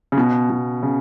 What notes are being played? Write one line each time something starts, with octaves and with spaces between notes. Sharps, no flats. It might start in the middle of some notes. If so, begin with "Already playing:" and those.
C#3
B2
B2
C#3